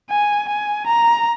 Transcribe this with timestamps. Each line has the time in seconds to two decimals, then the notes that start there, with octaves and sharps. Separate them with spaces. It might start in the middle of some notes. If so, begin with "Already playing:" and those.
0.10 G#5
0.48 G#5
0.86 A#5